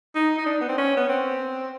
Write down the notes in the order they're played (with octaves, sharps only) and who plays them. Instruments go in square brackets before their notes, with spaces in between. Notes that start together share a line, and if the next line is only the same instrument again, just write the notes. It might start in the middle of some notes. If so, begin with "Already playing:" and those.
[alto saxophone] D#4
D#4
D4
B3
C4
C#4
B3
C4